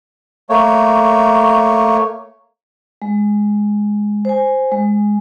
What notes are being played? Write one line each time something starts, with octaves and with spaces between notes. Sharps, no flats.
A3 A#3 C#5
G#3
C5 G#5
G#3